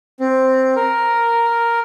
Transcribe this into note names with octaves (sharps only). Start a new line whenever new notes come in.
C4
A#4